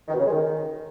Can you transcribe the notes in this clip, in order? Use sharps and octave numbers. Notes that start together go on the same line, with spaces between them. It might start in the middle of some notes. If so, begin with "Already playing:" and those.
D#3
B2
C#3
G#3
D#3